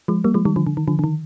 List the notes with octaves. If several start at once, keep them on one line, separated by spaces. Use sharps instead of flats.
F3 G#3
G3 A#3
F3 G#3
D#3 G3
D3 F3
D3
D#3
D3 F3
D3
D#3